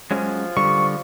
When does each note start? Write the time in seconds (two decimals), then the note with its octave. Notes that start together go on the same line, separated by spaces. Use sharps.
0.11 F3 F#3 G#3 C#4
0.57 D3 G3 C#6